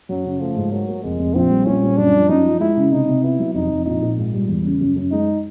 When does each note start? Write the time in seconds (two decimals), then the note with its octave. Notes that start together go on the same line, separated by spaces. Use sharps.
0.09 F#2 F#3
0.25 C#3
0.40 F3 A3
0.56 G#2
0.72 F#3 A#3
0.88 A#3
1.04 F1 G#3
1.19 F1
1.35 A#1 C4
1.51 G3
1.66 A#2 C#4
1.83 G3
1.98 F#2 D4
2.13 F3
2.29 F#2 D#4
2.44 F3
2.60 G#3 E4
2.77 C#3
2.91 C3 D#4
3.08 C3
3.23 B3 E4
3.39 F#3
3.54 F1 D#4
3.70 F1
3.86 A#1 D#4
4.02 A#2
4.17 G#2
4.34 G3
4.48 E2
4.65 C#3
4.81 F#2
4.96 F#2
5.11 G#3 D#4